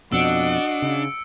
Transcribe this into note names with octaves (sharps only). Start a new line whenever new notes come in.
F2 B2 D4 F#4 D#5 E6 C#7 D7
C#3